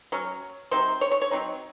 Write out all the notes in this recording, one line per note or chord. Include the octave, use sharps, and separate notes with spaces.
F#3 C#4 C#5
C3 F#3 C4 D#4 C5
C#5
C#5
C#5
F#3 C4 D#4